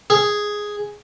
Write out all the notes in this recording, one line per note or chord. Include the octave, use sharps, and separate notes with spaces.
G#4